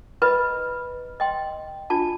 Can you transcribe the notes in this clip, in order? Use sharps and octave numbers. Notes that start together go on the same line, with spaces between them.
E4 B4 D#5 B5
D#5 G5 C6
D4 F4 A5